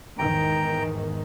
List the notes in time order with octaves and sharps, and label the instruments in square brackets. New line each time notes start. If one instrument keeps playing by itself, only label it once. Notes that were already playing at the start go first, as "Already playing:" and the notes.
[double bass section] E2 G#2 D#3 [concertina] G5 A#5